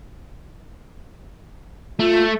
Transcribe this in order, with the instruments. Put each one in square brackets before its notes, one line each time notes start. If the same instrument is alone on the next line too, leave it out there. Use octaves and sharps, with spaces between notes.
[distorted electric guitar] A3 [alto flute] F4